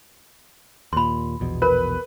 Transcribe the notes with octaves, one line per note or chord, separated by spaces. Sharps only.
D#2 A#2 B5 C6
A#1 E2 B2
A#4 B4